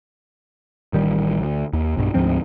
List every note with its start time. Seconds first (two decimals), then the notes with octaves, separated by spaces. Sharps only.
0.93 A1 D#3 G3
1.41 D2
1.73 D#2
1.97 B1 G2
2.14 D2 G#2 F3 C4